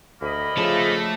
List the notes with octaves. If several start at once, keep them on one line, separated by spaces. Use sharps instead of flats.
D2 A#3 D#5 B5
C#3 F3 A3 A4